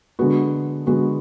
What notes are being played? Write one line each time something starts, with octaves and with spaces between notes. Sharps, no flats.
D3 G#3 B3 F#4
D3 G#3 B3 F#4